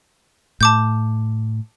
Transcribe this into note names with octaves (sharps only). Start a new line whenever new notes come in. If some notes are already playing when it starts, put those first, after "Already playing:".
A2 A5 D6 G6